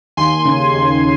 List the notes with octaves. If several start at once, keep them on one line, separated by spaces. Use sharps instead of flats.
D#2 G#5 C6
C#3
D#2